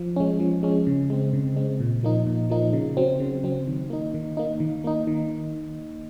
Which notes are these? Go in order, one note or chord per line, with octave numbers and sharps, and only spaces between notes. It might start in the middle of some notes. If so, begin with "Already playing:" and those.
Already playing: F3
G#3 C#4
F3
G#3 C#4
C#3
G#3 C4
C#3
G#3 C4
A#2
F3 A#3 D#4
A#2
F3 A#3 D#4
C#3
F#3 C4
C#3
F#3 C4
D#3
A#3 D#4
D#3
A#3 D#4
D#3
A#3 D#4
D#3